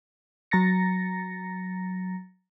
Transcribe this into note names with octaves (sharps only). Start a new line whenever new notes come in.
F#3 A#5 A6 A#6 C#7